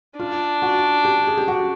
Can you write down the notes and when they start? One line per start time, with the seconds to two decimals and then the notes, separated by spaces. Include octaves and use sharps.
0.18 D4 F4
0.62 F#4
1.05 G4
1.27 G#4
1.37 G4
1.48 F#4